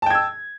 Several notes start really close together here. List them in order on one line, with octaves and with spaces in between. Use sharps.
A5 G5 G#6 E6